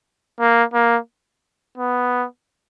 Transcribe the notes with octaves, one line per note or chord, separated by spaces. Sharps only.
A#3
A#3
B3